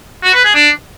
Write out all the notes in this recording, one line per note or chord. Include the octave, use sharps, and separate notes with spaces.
F#4
B4
G#4
D4